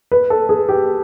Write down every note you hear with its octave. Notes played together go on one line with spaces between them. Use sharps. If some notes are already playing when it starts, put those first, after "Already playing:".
B4
A4
G#4
G4